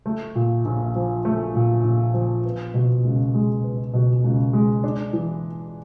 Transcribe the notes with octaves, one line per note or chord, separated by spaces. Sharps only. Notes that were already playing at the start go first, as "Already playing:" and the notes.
A3
A#2
A#1
F3
A3
A#2
A#1
F3
B3
B2
C#2
G#3
B3
B2
C#2
G#3
D4
E3